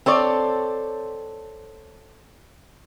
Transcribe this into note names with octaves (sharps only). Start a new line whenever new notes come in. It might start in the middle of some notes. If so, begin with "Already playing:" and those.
C4 A4 C#5 D5